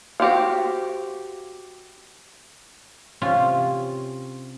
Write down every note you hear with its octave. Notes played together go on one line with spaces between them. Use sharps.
F#4 G4 C5 F5
C3 C#4 F4